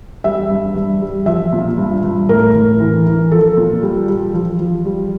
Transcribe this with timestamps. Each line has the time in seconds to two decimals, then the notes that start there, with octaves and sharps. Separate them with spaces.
0.24 G3 E5
0.50 G2
0.75 G2
1.01 G3
1.26 F3 E5
1.52 A#2
1.78 G2
2.03 G2
2.29 A2 A#4
2.55 A2
2.80 E3
3.06 E3
3.32 F3 A4
3.57 A#2
3.83 G3
4.09 G3
4.34 F3
4.60 F3
4.85 G3